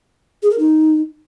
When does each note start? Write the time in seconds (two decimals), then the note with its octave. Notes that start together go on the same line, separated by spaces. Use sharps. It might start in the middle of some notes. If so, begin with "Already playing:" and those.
0.42 G#4
0.50 A#4
0.58 D#4